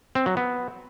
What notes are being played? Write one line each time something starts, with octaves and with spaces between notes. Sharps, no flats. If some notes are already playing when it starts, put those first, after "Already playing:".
C4
F#3
B3